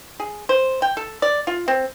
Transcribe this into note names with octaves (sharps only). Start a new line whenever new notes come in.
G#4
C5
G5
A4
D5
F4
C4